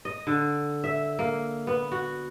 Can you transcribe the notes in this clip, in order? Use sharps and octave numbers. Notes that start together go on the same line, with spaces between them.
D#5
D3
E5
A#3
B3
F#4